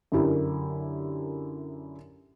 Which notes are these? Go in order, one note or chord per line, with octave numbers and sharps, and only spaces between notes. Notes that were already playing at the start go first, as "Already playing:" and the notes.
F#2 D3 E4 G4 A#4